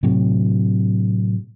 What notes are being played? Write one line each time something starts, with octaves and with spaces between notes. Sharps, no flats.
A2 C3 F#3